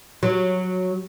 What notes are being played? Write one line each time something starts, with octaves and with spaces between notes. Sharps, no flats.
F#3